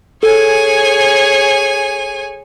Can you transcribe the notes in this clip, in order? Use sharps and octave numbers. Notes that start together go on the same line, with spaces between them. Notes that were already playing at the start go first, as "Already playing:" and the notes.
G#4 A4 C#5 G#5